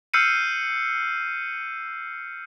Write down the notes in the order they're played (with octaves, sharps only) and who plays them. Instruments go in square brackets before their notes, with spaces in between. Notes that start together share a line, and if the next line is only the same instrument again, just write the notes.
[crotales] E6 F6 G6 C7 C#7 D#7